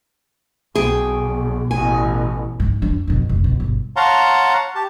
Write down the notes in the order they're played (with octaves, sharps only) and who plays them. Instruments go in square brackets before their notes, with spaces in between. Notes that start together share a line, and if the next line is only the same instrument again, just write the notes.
[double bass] B1 [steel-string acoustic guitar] G#4 G5
[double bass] A1 B2 [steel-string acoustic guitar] G#5
[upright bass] G#2
F2 D4
F2 B2
F1
B2
G1
[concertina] C#5 F5 F#5 A5 A#5 C6
G4 A5